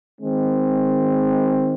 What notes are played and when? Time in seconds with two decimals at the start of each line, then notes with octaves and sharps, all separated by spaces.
0.19 D#3 G#3 C4